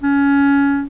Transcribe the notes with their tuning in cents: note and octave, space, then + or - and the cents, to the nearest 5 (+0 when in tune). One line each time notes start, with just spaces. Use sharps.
C#4 +20